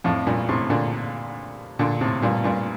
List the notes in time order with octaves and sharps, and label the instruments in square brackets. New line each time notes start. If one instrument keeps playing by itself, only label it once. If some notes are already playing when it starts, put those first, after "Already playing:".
[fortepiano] F2 A2
G2 A#2
A2 C3
A#2 D3
A#2 D3
A2 C3
G2 A#2
G2 A#2